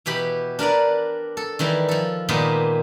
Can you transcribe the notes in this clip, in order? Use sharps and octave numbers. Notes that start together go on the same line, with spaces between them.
B2 E3 G4 B5
D4 A#4 B4 D5
A4
D#3 E3 G3 E4
F3 A4
A#2 D#3 G#3 B3 G4